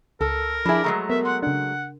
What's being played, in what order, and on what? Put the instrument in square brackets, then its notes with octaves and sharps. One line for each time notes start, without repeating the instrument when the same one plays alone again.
[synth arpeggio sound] C#2 [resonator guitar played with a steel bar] A4 [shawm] A#4
[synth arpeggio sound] F3 G#5 [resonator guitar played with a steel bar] D4 E4 [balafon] G#4 B5
[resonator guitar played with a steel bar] F#3 G#3 A3 [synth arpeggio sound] A#5
[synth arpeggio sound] B3 [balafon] A#4 [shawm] E5
[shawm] F#5 [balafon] C6
[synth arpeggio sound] C#3 D4 [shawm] F#5